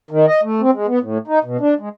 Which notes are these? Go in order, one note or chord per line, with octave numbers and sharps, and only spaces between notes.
D#3
D#5
A3
C4
G#3
B3
A2
D#4
B2
D4
G#3